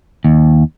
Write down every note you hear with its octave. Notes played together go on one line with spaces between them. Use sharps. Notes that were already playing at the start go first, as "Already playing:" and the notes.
D#2